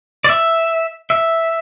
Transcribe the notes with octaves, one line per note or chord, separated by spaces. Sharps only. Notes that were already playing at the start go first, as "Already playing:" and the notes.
D5
E5
E5